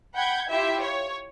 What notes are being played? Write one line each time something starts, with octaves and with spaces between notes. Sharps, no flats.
F#5 G5 B5 G6 G#6
E4 F4 G4 E5
C#5